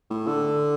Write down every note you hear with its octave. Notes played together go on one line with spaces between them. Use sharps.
A2
D3